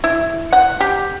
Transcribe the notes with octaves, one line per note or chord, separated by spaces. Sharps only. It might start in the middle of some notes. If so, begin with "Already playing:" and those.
E4
F#5
G4